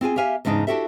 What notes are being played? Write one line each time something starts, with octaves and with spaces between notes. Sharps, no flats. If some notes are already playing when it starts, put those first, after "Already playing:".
C4 F4 G#4 G#5
G4 E5 F5 G#5
E2 G#2 C#3 D4 D#4
D4 E4 F#4 G4 A4 E5